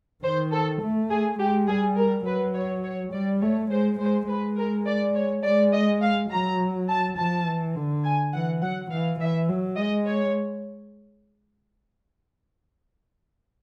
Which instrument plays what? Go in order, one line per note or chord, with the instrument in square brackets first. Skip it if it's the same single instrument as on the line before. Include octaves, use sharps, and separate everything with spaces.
[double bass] D#3 [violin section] C5
[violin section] A4
[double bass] A3
[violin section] G#4
[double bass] G#3 [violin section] G4
[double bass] G3 [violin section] G#4
[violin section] A#4
[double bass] F#3 [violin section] B4
[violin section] C#5
C#5
[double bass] G3 [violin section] D5
[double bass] A3 [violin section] C#5
[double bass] G#3 [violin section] C5
[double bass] G#3 [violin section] C5
[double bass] G#3 [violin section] B4
[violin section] A#4
D5
C#5
[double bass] G#3 [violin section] D5
[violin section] D#5
F5
[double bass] F#3 [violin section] A#5
[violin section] A5
[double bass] F3 [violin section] A5
[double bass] E3
D3
[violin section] G#5
[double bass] E3 [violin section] F#5
[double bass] F#3 [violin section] F#5
[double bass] E3 [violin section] F5
[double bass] E3 [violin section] E5
[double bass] F#3
[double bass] G#3 [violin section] D#5
[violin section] C#5